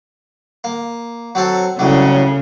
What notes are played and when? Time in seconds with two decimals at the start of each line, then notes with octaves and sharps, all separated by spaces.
0.64 A#3
1.35 F#3 C4 A4
1.79 C2 A2 C#3 F#3